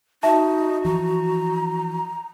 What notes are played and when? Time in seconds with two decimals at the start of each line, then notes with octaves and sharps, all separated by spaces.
0.23 D#4 F#4 E5 A5
0.85 E3 F3 A#5